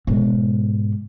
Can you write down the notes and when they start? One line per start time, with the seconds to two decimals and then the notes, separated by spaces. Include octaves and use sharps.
0.07 G#2 B2